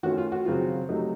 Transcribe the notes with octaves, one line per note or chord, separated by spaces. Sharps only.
D#3 A3 C#4 F4 F#4
F4
F#4
C#3 F#3 C4 F4
C3 F#3 A3 D#4